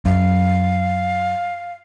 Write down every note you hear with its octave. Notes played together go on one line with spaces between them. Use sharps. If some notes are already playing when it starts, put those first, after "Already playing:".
F#2 F5